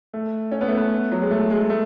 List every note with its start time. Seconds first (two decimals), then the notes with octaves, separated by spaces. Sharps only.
0.13 A3
0.51 C#4
0.61 B3
0.68 A3
0.77 B3
1.12 F#3
1.22 G#3
1.31 A3
1.50 G#3
1.70 A3